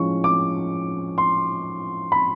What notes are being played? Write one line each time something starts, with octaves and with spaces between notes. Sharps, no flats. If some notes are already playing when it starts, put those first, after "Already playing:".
Already playing: A2 F3 G#3 C#4 C#6
D6
C6
B5